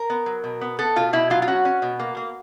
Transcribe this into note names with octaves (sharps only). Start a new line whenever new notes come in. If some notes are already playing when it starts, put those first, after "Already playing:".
Already playing: A#4
B3
F#3
B2
B3
B3 A4
B2 F4
B2 E4
F#3 F4
F4
C#4 F#4
C#4
B2
A#3
A#3